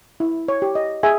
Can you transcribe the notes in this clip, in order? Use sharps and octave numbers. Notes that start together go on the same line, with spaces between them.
E4
C#5
G4
D#5
G#4 E5 G#5